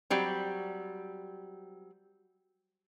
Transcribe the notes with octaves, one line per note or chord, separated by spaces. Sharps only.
F#3 G3 C4